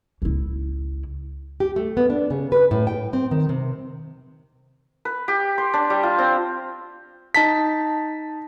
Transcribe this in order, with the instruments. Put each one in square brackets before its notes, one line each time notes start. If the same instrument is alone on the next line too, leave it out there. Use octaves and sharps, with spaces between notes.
[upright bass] C#2 E4
[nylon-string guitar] G4
A3
B3
D4
C#3
B4
A2
G5
C4
D#3
C3
[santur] B4
G4
C6
D4
G3
F4
C4
[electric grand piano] D#4 A5 B6